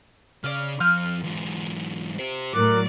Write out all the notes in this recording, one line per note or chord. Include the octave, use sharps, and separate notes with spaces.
C#3 D5 F5
F2 F4 F6 G6
E2 G#2
G4 C5
A2 F#3 A#4 D5 D6 F#6